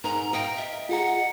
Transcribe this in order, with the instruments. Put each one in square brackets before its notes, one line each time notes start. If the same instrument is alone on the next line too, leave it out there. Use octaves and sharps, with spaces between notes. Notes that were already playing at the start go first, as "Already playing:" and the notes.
[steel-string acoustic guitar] G#2 D#4 A#4 [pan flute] A#5
[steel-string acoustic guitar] D#5 [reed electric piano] F5 [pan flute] G5
[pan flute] E5
[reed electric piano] F4 G#4 A#5 [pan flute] F#5